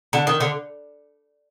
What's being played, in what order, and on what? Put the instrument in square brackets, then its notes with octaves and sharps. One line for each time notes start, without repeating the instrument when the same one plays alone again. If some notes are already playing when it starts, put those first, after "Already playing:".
[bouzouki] D3
D#3
D3